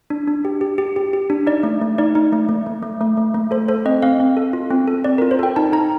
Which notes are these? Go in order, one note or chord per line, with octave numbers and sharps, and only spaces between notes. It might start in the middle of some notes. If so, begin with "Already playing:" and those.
D4
D4
G4
G4
G4
G4
G4
D4
D#4 D5
A3
A3
D#4 D5
D#4
A3
A3
A3
A3
A3
A3
A3
A4 C5
A4 C5
C4 D#5
C4 F5
C4
A4
F4
C4
A4
C4 D5
F4 A#4
C5
A4 G5
D#4 A5
D#4 A#5